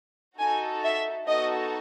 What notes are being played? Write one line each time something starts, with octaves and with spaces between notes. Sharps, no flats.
D#4 F#4 A4 G#5
E5
B3 D#4 F#4 A4 D#5